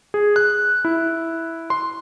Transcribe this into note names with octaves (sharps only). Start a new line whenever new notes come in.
G#4
F#6
E4
C6